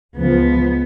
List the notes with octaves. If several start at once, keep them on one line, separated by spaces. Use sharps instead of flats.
C#2 F3 B3